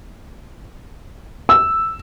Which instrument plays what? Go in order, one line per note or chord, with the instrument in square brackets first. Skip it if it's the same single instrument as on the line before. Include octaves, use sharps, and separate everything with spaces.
[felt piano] E6